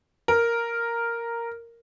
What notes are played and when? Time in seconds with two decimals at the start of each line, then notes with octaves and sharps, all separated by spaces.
0.28 A#4